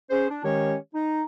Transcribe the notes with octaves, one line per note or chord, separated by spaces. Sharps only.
C#4 G#4 C5
D4
D#3 G#3 C#4 G4 C#5
D#4